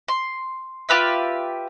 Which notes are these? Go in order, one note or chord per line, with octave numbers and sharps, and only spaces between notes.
C6
F4 G4 B4 E5